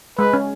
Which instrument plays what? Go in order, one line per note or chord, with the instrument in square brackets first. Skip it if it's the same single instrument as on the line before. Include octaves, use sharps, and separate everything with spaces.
[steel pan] G#3 [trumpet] B4
[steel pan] C#4